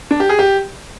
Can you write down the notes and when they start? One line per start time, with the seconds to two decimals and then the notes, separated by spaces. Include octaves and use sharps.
0.11 D4
0.20 G4
0.29 G#4
0.39 G4